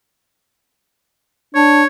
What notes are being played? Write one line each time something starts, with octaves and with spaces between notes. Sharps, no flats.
D4 C#5